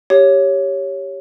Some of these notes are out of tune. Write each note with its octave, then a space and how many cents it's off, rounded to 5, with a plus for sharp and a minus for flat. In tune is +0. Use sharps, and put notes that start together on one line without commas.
G4 +0 C#5 +0